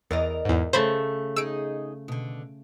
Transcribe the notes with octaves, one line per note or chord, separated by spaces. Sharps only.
E2 A#4 D5 D#5
E2 G#2
C#3 A3 C5 B5
D#4 G#4 E6 D7
B2 D3